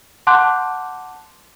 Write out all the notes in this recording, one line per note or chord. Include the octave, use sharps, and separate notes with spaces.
F#5 A5 C6 D6 F#6 G6